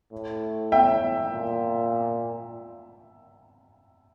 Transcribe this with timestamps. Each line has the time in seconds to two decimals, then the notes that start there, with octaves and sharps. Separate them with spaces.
0.12 A2
0.72 E5 G5
1.31 A#2